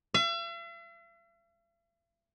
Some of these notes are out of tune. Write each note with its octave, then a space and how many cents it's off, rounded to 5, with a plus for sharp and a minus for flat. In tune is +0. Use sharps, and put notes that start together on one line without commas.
E5 +45